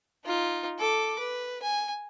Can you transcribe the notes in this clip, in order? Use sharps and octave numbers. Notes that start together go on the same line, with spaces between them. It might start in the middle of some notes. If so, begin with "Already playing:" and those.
D#4 F4
A4 D6
B4
G#5